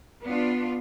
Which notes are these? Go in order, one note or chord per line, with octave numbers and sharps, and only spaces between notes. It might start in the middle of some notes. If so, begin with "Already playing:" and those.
B3 D4 F4